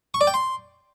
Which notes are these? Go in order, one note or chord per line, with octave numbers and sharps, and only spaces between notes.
C#6
D5
G5
C6